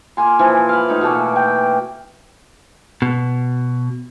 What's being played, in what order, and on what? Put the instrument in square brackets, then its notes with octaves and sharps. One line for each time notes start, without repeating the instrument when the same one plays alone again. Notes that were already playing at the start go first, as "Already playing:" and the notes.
[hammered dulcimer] A#3 F4 G#5 C6
A#2 E3 F3 F4
F5 B5
A2 D#4 D#5
B2 E3 A3 A#3
G5
[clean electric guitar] B2